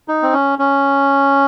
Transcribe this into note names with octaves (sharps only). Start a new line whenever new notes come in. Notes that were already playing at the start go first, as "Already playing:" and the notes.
D#4
C4
C#4
C#4